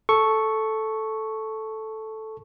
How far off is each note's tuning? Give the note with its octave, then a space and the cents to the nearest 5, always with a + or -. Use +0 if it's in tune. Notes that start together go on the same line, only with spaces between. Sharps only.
A4 -5 C#6 +0